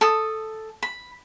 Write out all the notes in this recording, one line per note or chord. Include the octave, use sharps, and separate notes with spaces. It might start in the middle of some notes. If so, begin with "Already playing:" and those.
A4 D#6
B5